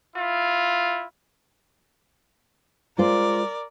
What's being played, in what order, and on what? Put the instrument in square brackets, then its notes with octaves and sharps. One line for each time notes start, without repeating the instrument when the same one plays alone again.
[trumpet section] E4 F4
[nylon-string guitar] G#3 F4 C5 [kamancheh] A#4 D5